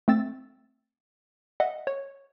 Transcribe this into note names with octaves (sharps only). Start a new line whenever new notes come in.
A3 C4 E6 A6
D#5 E5 F#5
C#5